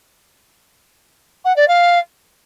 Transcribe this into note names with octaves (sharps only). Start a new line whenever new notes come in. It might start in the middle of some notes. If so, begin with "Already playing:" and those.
F#5
D5
F5